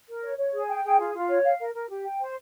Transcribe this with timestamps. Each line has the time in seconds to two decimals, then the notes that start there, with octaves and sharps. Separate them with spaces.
0.09 A#4
0.23 C#5
0.38 C#5
0.53 G#4
0.69 G5
0.84 G#4
0.99 F4
1.15 F4
1.29 C#5
1.44 F5
1.60 A#4
1.74 A#4
1.89 G4
2.05 G5
2.20 C5